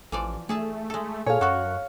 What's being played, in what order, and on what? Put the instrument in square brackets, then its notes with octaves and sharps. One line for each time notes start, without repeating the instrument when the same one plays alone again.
[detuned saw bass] A1 [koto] E3 F3 D5
[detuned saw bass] A3 [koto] G#4 E5 A5
[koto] G#3 A4
[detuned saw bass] A#2 [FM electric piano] G#4 A4 G#5 [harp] C#5 F5
[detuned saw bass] F#2 [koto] F#4 A4 [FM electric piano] F#5 C#6 F#6